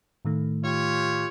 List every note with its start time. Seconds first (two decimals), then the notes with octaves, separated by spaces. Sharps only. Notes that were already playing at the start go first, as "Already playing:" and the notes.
0.25 A2 D#3 A3
0.63 F4 G4 C#5